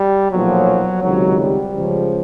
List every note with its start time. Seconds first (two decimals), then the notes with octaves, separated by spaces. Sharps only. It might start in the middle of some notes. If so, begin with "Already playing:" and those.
Already playing: G3
0.32 B1 A#2 F3 F#3
1.02 C#2 C3 D#3 F#3
1.38 G3
1.73 C#2 C#3 F3